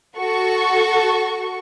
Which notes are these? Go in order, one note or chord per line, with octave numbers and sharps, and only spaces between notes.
F#4 A4 C#6